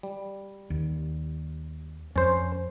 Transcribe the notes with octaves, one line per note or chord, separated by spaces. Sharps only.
G3
D#2
F2 C#4 C5